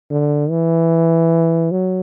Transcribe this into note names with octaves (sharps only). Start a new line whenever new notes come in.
D3
E3
F#3